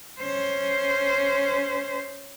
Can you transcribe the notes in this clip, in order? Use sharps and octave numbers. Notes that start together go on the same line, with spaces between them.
C#4 C5